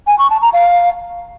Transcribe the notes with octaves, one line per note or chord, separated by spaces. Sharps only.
G#5
C#6
A5
A#5
F5